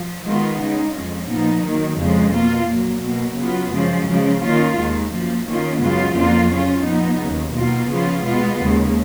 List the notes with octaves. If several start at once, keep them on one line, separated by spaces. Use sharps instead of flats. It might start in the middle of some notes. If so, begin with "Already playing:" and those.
Already playing: F3
D#3 G#3 B3 F4
C#3 G#3 D#4
F2 F3 G#3 C#4
A#2 F3 B3 D#4
D#3 F#3 A#3
F2 C#3 F3 G#3
B2 A#3 F4
A#2 F#3 A#3
B2 F#3 A#3
C#3 F#3 B3 F4
F#2 C#3 F3 G#3
C#3 F3 G#3
D#3 A#3 C#4 F4
D#2 D#3 G#3
F#2 F3 A#3
D#3 A#3 C#4 F4
F#2 C#3 G#3 B3 F4
F2 F3 A#3 F4
C#3 F#3 C#4 F4
A#2 F3 B3 D#4
D#2 C#3 F#3
B2 A#3 F4
C#3 F3 B3 F4
B2 G#3 B3 F4
D#2 C#3 G#3